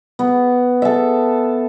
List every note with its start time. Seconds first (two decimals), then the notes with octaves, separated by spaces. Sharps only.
0.19 B3
0.82 A4 E5